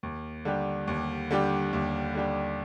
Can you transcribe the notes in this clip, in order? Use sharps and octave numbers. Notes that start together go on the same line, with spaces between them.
D#2
D3 G3 D4 G4
D#2
D3 G3 D4 G4
D#2
D3 G3 D4 G4